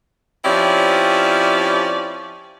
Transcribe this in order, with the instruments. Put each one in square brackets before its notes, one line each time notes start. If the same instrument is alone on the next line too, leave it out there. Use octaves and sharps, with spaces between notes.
[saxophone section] F3 C4 C#4 E4 G4 D5